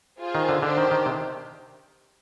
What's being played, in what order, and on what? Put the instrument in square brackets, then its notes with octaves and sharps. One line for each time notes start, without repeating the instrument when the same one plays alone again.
[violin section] F4 G#4 C5
[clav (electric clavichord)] D#3
D3
[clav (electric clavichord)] D3 [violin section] D4 G4 C5
[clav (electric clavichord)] D#3
D#3
C3